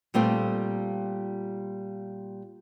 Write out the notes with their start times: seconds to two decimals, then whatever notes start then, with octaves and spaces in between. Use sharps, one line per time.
0.14 A#2 G3 A3 C4 F4